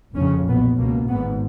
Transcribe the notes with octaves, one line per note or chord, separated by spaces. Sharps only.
F1 F2 C#3 C#4
B1 A#2 B3
C#2 B2 A#3
G#1 G#2 B3